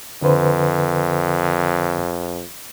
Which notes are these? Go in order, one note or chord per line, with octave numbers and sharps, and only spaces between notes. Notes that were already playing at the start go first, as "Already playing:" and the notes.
F2 D3 B4 C5